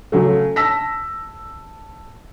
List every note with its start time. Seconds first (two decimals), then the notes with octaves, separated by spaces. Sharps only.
0.12 C#3 F#3 A3
0.56 A5 E6 A#6 B6